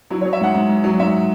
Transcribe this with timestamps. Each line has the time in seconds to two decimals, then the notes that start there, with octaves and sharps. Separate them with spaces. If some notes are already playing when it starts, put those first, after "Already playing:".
0.10 F#3 E4
0.21 C#5
0.25 F#3
0.33 E5
0.40 G#2 F#5
0.55 G#2
0.69 G#2
0.84 F#3
0.99 G#2 E5